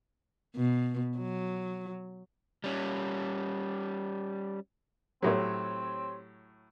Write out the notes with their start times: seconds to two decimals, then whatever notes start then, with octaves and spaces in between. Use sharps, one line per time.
0.56 B2
1.18 F#3
2.64 G3 C#4
5.22 A2 F#3 C4 G4 C#5